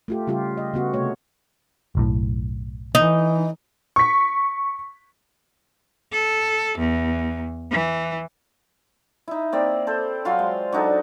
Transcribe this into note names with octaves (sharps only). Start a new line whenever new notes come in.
A3 F4 G4
C#3 G3 F4 G4
D#5
C#3 B3 F#4
C3 A3 C#5
F#1 B1 A2
E3 D#4
C#6 B6
A4
E2
E3
D#4 E4
A#3 C4 D5
A4 C5
F#3 F4 F5 C6
G#3
F#3 D4 D#4 A4